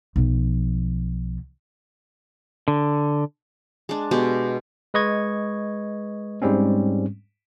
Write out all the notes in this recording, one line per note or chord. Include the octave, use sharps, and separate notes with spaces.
B1 F3
D3
G#3 D4
B2 G#3 G4
G#3 B4 D#5 C#6 G#6
G#2 G3 G#3 C4 C#4